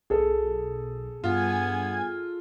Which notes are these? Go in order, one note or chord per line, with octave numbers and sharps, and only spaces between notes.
B1 G#4 A4
G2 B3 F4 G#5 G#6